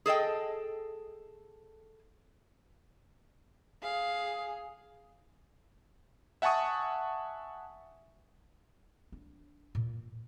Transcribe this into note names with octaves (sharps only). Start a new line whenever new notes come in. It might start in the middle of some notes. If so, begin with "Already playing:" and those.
G#4 A4 D#5 G5
G#4 F5
E5 F#5 G#5 A5 C#6 D#6
D4
A#2